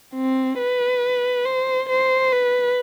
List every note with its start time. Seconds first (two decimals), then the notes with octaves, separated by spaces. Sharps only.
0.16 C4
0.59 B4
1.45 C5
1.89 C5
2.32 B4